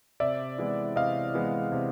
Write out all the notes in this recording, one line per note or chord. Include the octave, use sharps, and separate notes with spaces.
C3 D5 E5
E3 G#3 B3 E4
C3 D#5 F5
E3 G#3 B3 E4
C3